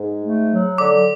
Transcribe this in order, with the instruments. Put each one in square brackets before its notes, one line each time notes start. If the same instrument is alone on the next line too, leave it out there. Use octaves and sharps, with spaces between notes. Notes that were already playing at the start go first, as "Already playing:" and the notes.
Already playing: [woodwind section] G#2
A3
F#3
[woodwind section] D3 [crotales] D6